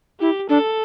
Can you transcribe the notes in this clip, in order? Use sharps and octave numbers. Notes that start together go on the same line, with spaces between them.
E4 G4
D4 A4